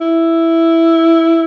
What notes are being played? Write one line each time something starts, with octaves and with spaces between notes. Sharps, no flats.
E4